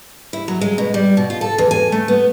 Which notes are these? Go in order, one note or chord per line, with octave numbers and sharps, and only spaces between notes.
E4
F#3
G#3
B2
G3
B2
F4
A4
E2
G#5
A3
B3